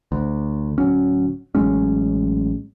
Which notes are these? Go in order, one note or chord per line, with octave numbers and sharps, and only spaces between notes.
D2
D1 G1 F#3 C#4
A1 F#3 G#3 C#4